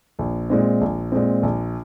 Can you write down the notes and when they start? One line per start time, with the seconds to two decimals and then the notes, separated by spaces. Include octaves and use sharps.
0.19 A#1
0.50 A#2 G#3 C4
0.81 A#1
1.12 A#2 G#3 C4
1.43 A#1